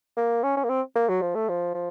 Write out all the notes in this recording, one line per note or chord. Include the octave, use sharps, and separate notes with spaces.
A#3
C#4
C#4
A#3
C4
A#3
F#3
F3
A3
F3
F3